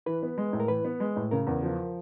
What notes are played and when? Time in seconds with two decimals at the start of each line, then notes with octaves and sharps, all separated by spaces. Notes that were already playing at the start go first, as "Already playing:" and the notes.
0.06 E3 B4
0.23 B3
0.38 G#3
0.53 A2
0.60 A#4
0.68 E3 B4
0.85 B3
1.00 G#3
1.16 A2
1.31 C#3 A#4
1.47 E2
1.63 F3